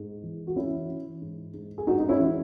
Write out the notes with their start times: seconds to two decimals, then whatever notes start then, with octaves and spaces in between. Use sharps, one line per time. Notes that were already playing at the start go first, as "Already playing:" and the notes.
Already playing: G#2
0.23 E3
0.47 F#4
0.56 E3 C#4 E4
0.89 E3
1.21 G#2
1.54 G#2
1.78 G#4
1.87 G#2 D#4 F#4
2.00 D#4
2.09 C#4 E4
2.20 E3